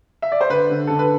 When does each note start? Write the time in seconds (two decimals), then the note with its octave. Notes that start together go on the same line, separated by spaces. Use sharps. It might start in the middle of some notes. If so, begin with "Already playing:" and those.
0.22 E5
0.32 D5
0.41 C5
0.50 D3 B4
0.70 D3
0.87 D3 A4
0.99 B4